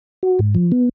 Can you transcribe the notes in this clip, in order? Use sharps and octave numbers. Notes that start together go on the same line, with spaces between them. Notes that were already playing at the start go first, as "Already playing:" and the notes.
F#4
G#2
F3
B3